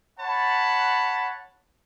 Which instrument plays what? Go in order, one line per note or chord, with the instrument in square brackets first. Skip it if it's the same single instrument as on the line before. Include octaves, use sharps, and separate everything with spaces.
[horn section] C#5 F#5 A5 B5